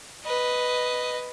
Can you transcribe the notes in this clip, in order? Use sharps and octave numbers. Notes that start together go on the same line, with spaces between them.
B4 D#5